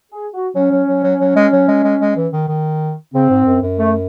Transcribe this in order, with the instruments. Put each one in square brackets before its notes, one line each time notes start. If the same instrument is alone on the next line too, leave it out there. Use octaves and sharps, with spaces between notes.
[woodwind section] G#4
F#4
[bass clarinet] F#3 [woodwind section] C#4
[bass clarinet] F#3
F#3
F#3
F#3
G#3
F#3
G#3
G#3
G#3
E3
D#3
D#3
[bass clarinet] C#3 [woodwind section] C4
[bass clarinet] G#2
F#2
F#2
[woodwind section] A3